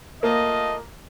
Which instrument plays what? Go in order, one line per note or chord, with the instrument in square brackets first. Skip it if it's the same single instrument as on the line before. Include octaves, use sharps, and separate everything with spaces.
[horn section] A3 F4 D#5 [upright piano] A#3